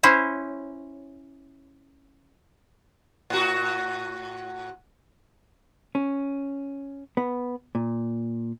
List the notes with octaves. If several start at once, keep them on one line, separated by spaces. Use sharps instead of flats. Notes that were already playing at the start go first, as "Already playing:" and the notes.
C#4 E4 C5 C#5
A2 F#4
C#4
B3
A#2